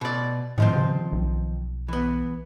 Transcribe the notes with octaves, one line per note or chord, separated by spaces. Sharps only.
B2 D5
A2 D#3 F3 C4
C#3
B1
E3 B3